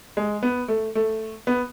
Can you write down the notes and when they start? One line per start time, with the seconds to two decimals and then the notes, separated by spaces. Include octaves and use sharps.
0.17 G#3
0.43 B3
0.68 A3
0.95 A3
1.47 B3